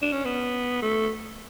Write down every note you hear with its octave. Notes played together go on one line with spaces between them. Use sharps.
D4
C#4
B3
A3